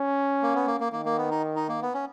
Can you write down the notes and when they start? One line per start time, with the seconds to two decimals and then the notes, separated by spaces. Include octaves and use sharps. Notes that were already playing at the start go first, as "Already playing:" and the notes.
Already playing: C#4
0.42 A#3
0.55 B3
0.67 A#3
0.80 A#3
0.92 D#3 A#3
1.05 A#3
1.18 B3
1.31 D#4
1.56 D#4
1.69 A#3
1.82 B3
1.94 C#4